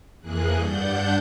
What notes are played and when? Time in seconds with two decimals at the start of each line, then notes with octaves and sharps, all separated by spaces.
0.21 F2 E3 A#3 G#4 F#6
0.54 G2 D4 F#5 G6